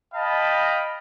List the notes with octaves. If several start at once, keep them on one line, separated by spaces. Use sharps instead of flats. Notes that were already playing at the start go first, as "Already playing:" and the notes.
D#5 F5 G5 A5 B5